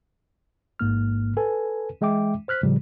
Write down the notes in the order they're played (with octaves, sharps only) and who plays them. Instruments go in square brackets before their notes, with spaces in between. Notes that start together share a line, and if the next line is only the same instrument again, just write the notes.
[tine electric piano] A1 G#2 A#3 F6
A4 B4 G#5
E3 G#3 E5 G5 D6
C5 F6 F#6 B6
A2 C#3 F3 G3